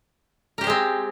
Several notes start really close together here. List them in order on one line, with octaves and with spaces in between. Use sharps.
A#4 G4 C5 G#3 C4